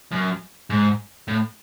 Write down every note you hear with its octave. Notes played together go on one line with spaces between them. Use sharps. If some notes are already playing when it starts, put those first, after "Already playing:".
F#2
G#2
A2